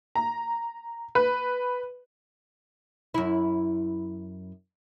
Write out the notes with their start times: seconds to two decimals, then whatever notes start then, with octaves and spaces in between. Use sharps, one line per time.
0.15 A#5
1.15 B4
3.14 F#2 E4